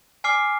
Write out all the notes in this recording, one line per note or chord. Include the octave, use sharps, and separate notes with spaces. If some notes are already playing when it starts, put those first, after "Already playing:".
G#5 D6 F6 C7